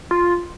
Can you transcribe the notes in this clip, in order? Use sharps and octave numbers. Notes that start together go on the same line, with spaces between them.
F4